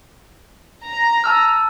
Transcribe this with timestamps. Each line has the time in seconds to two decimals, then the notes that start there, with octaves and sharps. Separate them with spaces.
0.84 A#5
1.24 A5 E6 F6